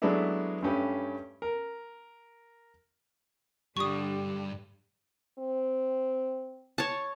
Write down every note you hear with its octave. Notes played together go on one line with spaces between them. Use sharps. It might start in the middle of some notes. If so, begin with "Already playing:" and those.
F#3 G#3 A3 B3 D4 E4
G2 A3 C#4 G4 B4
A#4
G2 D3 G3 D4 G4 C#6 D#6
C4
C#5 A5